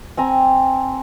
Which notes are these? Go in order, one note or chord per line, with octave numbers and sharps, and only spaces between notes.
C4 G#5 A#5